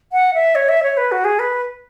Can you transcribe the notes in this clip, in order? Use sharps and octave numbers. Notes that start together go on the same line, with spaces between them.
F#5
E5
C#5
E5
C#5
B4
F#4
G#4
B4